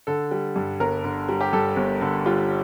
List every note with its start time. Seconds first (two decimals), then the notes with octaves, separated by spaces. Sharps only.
0.07 D3 A4
0.31 G3
0.56 G2
0.80 G1 A#4
1.04 D3
1.29 G3
1.41 G4
1.53 G2 A4
1.77 G1
2.01 D3
2.26 G3 F4